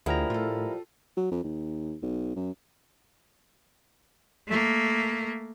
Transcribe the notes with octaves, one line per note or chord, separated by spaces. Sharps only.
D2 F3 G3 E4 G#4 A#4 F#5 A#5
A2 F4 A4
F#3
F2
D#2
B1
F#2
A3 A#3